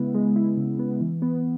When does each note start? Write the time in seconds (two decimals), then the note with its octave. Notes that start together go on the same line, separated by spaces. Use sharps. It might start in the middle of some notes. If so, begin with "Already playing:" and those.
Already playing: C#3 G#3 B3 E4
0.14 G#3
0.36 E4
0.57 C#3
0.79 B3
1.01 E3
1.22 B3